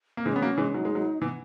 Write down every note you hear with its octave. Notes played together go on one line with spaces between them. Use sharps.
A#3
E3 G#3 C#4
B3
F#3 A#3
E3 G#3
F#3 D#4
G#3
F#3
E3 B3